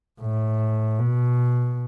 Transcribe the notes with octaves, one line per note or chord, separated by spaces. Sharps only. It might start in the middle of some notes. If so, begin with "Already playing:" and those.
A2
B2